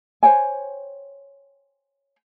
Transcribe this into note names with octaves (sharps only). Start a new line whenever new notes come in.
C5 C#5 G5 G#5